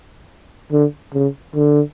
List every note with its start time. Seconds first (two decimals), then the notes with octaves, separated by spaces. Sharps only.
0.72 D3
1.14 C#3
1.56 D3